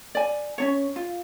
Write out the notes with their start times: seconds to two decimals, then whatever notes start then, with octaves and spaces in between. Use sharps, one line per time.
0.15 D5 G#5
0.58 C#4 D4 C#5
0.96 F4